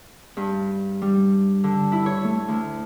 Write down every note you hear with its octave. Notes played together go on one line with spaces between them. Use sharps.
G2
G3
D3
E4
C#5
A3
D2